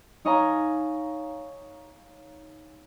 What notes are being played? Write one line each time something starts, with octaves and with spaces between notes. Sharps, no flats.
D#4 C#5 D#5 F5 G#5 A#5